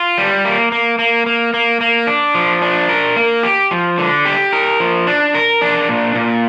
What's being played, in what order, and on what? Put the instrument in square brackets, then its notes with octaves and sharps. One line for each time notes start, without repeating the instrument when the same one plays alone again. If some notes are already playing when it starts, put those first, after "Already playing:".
Already playing: [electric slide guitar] F4
G3
A#3
A#3
A#3
A#3
A#3
A#3
D4
F3
D4
A#4
A#3
G4
F3
D3
G4
A#4
F3
D4
A#4
D4
A#2
A#2